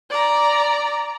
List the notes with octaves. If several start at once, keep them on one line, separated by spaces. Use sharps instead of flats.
D5 A#5